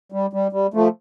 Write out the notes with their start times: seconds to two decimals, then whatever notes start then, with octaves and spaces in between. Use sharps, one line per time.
0.12 G3
0.33 G3
0.53 G3
0.74 F3 A3